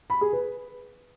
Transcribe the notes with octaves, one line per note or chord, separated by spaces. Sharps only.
B5
G#4
B4